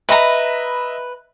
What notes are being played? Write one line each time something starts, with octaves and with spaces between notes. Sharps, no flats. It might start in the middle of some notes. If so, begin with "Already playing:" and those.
B4 D#5 E5 A#5 B5